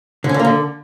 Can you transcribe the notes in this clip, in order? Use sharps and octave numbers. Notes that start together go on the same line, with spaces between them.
D3
C#4
D3
A#3
D3